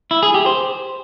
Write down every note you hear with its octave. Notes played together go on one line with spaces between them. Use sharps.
E4
G#4
G4
C5